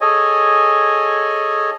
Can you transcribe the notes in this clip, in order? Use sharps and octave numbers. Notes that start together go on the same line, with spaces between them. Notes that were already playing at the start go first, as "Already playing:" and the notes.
G#4 A4 C#5 D#5 G#5